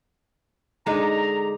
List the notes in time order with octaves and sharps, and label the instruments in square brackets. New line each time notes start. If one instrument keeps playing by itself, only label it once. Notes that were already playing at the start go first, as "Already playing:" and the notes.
[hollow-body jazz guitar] D3 G#3 D#4 [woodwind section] A#5